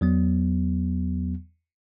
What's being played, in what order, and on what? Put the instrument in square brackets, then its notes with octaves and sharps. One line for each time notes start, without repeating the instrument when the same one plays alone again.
[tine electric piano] E2 F#3 B3